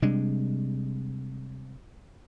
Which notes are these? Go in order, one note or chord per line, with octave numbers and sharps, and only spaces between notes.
C3 G3 G#3 D4